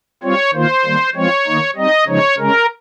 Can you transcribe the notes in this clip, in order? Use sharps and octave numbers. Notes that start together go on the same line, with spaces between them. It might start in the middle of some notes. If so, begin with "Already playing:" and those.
G3 C4 F4 C#5
D#3 A#3 F4 C5
D#3 G3 A#3
F3 G#3 C4 F4 C#5
D#3 A#3 D#4
G3 C4 D#4 D#5
C#3 F3 G#3 D#4 C#5
C#3 G#3 C#4 A#4